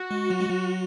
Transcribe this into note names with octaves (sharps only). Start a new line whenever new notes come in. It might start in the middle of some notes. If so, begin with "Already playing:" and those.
Already playing: F#4
G#3
F#3
G#3
F#3